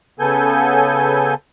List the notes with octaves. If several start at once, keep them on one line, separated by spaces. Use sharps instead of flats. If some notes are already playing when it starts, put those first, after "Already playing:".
C#3 B3 A4 G#5 G6